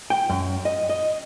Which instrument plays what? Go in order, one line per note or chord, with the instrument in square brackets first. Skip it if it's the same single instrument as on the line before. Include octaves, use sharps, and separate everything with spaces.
[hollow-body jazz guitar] G5
F#2
D#5
D#5